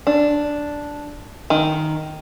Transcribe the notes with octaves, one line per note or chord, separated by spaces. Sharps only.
D4
D#3